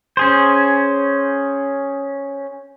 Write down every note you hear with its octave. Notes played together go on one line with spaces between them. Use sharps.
C#4 G#4 C5